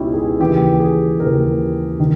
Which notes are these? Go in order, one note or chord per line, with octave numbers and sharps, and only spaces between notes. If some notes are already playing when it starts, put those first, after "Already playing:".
Already playing: C#2 B2 C#4 D#4 E4 G4
G#4
D#2 C#3 E3 G4
G#4
D#2 C#3 E3 A#4
D#3